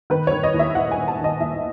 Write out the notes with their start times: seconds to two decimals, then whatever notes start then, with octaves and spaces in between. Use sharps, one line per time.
0.10 D#3 B4
0.27 D#3 C#5
0.43 D#5
0.54 D#2
0.59 E5
0.75 D#2 F#5
0.92 G#5
0.97 D#3
1.08 A5
1.19 D#3
1.24 D#5
1.40 D#2 E5